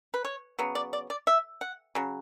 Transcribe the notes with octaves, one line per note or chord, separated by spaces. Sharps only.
B4
C#5
C#3 F#3 B3
D5
D5
D5
E5
F#5
C#3 F#3